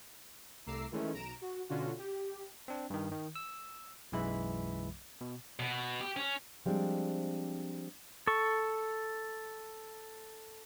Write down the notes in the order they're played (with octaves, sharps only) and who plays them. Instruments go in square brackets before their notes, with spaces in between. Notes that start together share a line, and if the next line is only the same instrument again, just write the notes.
[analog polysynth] C2 A3 A#5 D6 E6 C7
D#3 E3 G#3 A3 C#4
B1 A#5 D7 E7
F#4
B2 D3 C#4 D4 F4 F#4
G4
[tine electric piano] C4 D4
G2 D#3
D#3
E6
B1 F#2 E3 G#3 E5 B5
B2
[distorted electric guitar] B2
G4
C#4
[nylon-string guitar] F3 G3 G#3 C4 D4
[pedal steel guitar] A4 C#6